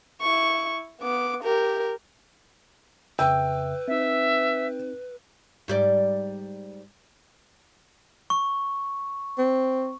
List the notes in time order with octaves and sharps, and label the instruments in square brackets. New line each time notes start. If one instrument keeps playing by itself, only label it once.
[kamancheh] E4 C#6
B3 D6
G4 A#4
[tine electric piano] F2 C#3 E5 [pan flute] B4 [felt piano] G5 E6
[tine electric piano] C4 D#4 [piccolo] E5
[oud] G#2 G3 D5
[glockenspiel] C#6
[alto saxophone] C4